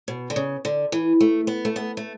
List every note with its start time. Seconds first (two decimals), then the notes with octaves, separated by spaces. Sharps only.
0.08 B2
0.30 D3
0.36 C#3
0.65 D3
0.92 E3
1.20 A3
1.47 B3
1.65 A3
1.76 B3
1.97 A3